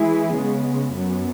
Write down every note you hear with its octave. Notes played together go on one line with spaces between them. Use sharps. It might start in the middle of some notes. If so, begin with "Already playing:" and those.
Already playing: E3 G#3 E4 G#4
C#3 G#3 B3
F#2 F#3 B3